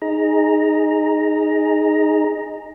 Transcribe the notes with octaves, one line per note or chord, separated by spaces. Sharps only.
D#4 G#4 A#5